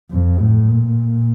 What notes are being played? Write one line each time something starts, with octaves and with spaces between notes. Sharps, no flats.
F2
A2
A#2